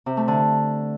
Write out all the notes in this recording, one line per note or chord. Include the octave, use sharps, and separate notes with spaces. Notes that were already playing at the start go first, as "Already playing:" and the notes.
C3
A3
D3